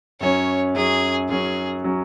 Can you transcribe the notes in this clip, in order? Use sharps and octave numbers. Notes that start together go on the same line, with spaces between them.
F#2 F#3 C#4 C#5
F#2 F#3 C#4 G#4
F#2 F#3 C#4 G#4
F#3 C#4